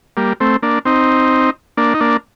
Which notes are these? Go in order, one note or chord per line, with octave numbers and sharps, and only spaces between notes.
G3 A#3
A3 C4
A#3 D4
C4 D#4
A#3 D4
D#4
A#3 D4